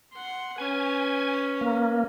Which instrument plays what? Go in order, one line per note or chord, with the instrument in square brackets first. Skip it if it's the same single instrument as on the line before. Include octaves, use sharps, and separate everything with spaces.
[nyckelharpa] F#5 C6
[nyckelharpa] C#4 B4 [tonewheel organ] G#5
[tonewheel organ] A#3